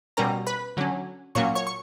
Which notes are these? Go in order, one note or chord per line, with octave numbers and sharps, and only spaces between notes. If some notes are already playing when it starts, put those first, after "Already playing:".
B2 G3 C#4 A#4 A#5
B4 B5
D3 F#3 C#4
A#2 F#3 A#3 C#4 C#5 C#6
C#5 C#6
C#6